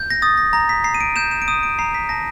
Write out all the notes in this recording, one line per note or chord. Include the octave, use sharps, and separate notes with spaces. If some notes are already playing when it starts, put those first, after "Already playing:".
Already playing: G6
A#6
D#6 A6
A#6
A#5 A#6
B6
A#5 C7
D#7
D7
G6 E7
E7
D7
D#6 D#7
D7
A#5 C7
B6
A5 A#6